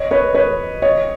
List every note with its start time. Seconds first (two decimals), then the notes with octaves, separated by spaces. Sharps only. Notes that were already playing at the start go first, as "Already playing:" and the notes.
Already playing: C#5 D#5
0.11 B4 C#5
0.34 B4 C#5
0.82 C#5 D#5